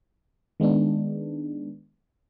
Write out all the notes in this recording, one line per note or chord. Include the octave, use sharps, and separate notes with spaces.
D#3 G#3 B3 D4